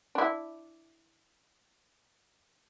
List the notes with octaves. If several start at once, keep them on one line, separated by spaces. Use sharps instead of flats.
D4 E4